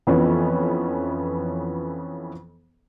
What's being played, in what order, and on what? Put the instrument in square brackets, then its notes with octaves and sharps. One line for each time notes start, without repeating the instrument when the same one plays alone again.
[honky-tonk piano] F2 E3 F3 B3 C#4